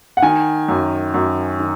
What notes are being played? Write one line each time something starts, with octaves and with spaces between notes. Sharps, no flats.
F#5
D#3 G#5
F#2
F#2
D#3